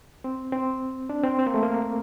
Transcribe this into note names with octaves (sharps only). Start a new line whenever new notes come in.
C4
C4
D4
C4
C4
A#3
A3
A#3